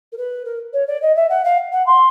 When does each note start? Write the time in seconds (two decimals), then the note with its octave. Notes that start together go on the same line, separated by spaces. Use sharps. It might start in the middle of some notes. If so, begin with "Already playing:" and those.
0.12 A#4
0.17 B4
0.45 A#4
0.73 C#5
0.87 D5
1.02 D#5
1.16 E5
1.29 F#5
1.44 F5
1.72 F#5
1.86 C6